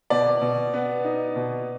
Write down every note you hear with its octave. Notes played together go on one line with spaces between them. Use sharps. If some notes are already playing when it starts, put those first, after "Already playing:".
B2 D5
B2
B3
D#4
B2